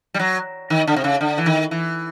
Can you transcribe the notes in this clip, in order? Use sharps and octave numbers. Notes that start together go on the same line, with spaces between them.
G3
F#3
D#3
D3
C3
C#3
D3
E3
D#3
E3